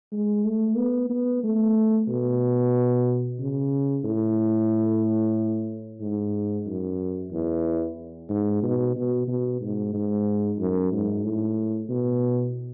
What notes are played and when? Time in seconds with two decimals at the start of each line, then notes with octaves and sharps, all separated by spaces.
0.12 G#3
0.45 A3
0.77 B3
1.10 B3
1.43 A3
2.08 B2
3.39 C#3
4.04 A2
6.01 G#2
6.67 F#2
7.32 E2
8.29 G#2
8.63 B2
8.96 B2
9.28 B2
9.61 G#2
9.94 G#2
10.59 F#2
10.92 G#2
11.24 A2
11.89 B2